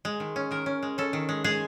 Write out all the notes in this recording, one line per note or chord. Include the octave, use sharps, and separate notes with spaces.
G#3
D#3
C#4
D#3 A#4
C#4
G#3
C#4 A4
D#3
G#3
G#3 G#4